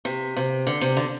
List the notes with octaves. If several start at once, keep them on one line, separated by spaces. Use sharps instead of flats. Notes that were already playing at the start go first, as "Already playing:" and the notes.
C3
C3
D3
C3
D3